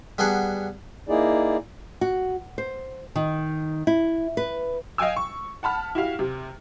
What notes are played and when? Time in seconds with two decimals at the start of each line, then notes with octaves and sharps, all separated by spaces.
0.18 G3 B3 D4 G#4 F#5
1.09 A#3 D#4 E4 G#4 D5
2.01 F#4
2.58 C5
3.16 D#3
3.87 E4
4.37 B4
4.98 D#5 F5 G5 G#5 E6
5.16 C#6
5.63 F#5 A5 B5 F6
5.95 E4 F#4 G4 F5
6.19 C3